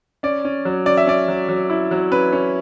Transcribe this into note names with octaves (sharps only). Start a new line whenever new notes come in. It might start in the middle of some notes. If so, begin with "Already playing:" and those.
C#4 D5
C#4
F#3
C#4 D5
E5
C#4 D5
F#3
F#3
E4
F#3
C#4 B4
C#4